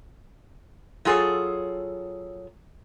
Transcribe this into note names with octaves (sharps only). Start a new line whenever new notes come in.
F#3 F4 G#4 A4 C#5